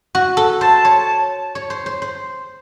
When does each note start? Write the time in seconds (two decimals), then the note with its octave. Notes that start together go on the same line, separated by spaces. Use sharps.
0.15 F#4
0.37 A4
0.61 C5 A5
0.85 C#5
1.55 C#5
1.70 C5
1.86 C5
2.02 C5